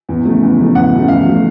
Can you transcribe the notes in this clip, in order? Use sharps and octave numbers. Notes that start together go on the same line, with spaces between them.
E2
C#3 F3 A3
E2
C#3 F3 A3
E2 F#5
C#3 F3 A3
E2 F5
C#3 F3 A3